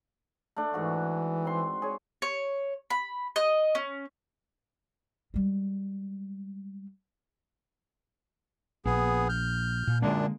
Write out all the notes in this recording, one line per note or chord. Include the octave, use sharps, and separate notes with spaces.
A3 D4
G#2 E3 F#4
C4 C6
G#4 C#5
C#5
B5
D#5
C#4
G3 G#3
A#1 B3 G#4
F6 G6
A#2
F#2 A#2 D3 G#3 A#3 D4